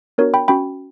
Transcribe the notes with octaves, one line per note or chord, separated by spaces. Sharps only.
B3 D4 F#4 A#4 C#5
G5 B5
C#4 F#4 G5 B5